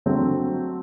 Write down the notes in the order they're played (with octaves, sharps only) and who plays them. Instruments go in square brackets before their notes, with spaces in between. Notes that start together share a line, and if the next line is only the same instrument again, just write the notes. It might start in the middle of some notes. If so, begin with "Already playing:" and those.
[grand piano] D3 F#3 A3 C4